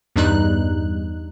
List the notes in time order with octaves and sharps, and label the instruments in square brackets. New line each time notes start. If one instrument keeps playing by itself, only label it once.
[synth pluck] E2 G2 G3 D#4 F#6